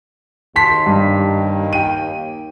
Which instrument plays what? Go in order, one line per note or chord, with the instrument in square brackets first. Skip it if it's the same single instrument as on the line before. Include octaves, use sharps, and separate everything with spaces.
[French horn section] D#2 D#4 [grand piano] A5 C6 B6
[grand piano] G2
G5 D#7